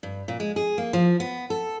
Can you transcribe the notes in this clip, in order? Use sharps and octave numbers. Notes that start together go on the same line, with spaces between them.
G2
A#2
G#3
G#4
A#3
F3
B3
A4